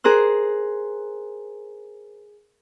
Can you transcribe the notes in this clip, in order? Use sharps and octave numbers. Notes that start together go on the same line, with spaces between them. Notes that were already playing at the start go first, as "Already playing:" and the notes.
G#4 A#4 C5 F#6